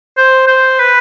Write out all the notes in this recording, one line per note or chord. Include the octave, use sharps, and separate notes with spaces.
C5
C5
B4